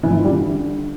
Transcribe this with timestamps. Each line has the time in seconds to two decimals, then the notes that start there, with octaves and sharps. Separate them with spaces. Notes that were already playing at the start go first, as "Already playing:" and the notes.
0.03 E3
0.10 F3
0.17 D#3
0.24 G3
0.31 D3